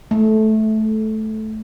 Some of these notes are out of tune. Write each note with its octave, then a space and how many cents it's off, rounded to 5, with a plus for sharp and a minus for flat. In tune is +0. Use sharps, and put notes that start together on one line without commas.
A3 -15